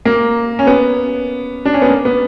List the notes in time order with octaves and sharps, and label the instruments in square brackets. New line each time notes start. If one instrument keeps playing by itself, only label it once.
[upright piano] A#3
C#4
B3
D4
C#4
B3
A#3
B3